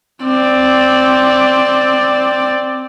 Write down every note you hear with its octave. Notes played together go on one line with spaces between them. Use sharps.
C4 D5